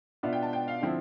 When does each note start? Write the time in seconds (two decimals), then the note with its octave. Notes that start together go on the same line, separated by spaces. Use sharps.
0.23 B2 B3 D4 F4 E5
0.33 G5
0.43 A5
0.53 G5
0.68 F5
0.82 D3 F3 C4 E4